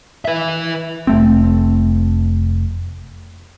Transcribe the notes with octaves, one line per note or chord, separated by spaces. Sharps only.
B4 E5
F1 A3 C4